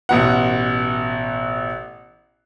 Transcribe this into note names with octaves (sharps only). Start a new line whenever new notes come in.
A1 B2 F#5